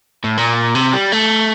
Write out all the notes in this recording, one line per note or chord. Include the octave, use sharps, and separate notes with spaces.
A2
A#2
C3
G3
A3